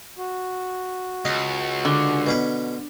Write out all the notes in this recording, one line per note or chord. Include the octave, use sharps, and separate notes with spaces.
F#4
C#2 D#5
D3
B2 C#4 B4